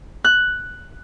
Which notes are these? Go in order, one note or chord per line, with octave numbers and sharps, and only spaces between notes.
F#6